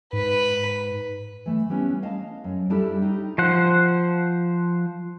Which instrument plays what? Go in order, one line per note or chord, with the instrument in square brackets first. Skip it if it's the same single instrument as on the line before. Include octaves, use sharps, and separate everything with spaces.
[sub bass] G#2 [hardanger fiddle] B4
[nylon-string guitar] E3 A3
G3 B3 C#4 D4 E4
D#5 F5 A5
F#2
G3 D4 E4 G4 A4 E5
D#4 G4
[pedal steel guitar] F3 C5 F#5